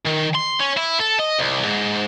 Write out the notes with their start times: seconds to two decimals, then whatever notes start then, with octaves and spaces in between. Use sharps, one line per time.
0.05 D#3
0.34 C6
0.60 C#4
0.77 E4
0.99 A4
1.19 D#5
1.39 C2
1.65 G#2